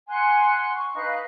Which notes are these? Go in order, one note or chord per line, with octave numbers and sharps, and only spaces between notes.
F#5 G#5 C6 F#6
C#6
D#4 B4 F5 F#6